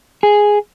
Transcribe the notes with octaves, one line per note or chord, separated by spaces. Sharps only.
G#4